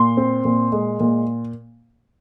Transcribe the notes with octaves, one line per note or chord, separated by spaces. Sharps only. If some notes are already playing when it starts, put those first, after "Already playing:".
Already playing: A#2 C6
C4
A#2
G#3
A#2